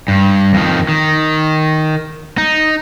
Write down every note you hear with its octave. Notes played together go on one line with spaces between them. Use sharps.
G2
F2 D#3
D#3
D#4